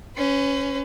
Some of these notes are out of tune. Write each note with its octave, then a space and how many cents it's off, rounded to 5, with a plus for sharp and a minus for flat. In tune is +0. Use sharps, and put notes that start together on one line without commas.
C#4 +0 B4 +40